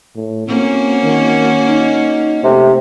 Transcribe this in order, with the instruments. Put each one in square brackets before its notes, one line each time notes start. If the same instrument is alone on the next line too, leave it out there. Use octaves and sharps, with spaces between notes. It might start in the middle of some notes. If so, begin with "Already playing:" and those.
[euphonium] A2
[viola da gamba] A#3 C#4 F#4 [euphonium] C4
[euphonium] D#3
D#4
[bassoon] C3 [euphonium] A3